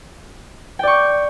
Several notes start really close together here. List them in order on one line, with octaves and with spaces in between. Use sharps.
G5 D5 C#6